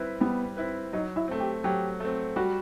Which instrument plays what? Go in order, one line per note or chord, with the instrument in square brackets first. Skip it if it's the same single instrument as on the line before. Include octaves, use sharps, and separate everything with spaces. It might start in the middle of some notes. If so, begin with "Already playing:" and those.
Already playing: [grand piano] G3 C4 E4 B4
[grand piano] G3 [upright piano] B3
[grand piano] C4 E4 B4
[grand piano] F#3 [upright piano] D#4
[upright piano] E4
[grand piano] A3 C4
[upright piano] G4
[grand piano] F#3 [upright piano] G4
[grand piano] A3 C4
[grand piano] G3 [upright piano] F#4